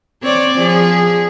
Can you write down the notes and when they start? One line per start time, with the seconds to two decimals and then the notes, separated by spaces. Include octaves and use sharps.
0.22 C4 C#5 D5
0.58 F3 G#4